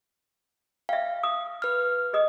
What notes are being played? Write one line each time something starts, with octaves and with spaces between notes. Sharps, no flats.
E5 F5 G5
D#6
B4 F6
G#4 D#5 D#6